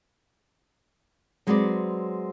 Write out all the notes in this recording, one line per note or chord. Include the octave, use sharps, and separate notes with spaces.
F#3 G#3 C4 F#4 B4 D5